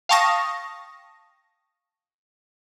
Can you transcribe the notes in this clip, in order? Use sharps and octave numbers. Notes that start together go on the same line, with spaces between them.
F5 G5 A5 C#6 D#6 A#6